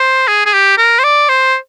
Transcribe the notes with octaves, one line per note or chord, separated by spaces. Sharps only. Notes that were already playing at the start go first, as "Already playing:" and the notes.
Already playing: C5
G#4
G#4
G4
A#4
C5
D5
C5